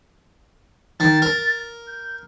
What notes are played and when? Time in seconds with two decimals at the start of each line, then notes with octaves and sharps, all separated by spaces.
1.00 D#3 A6
1.22 A#4
1.87 G6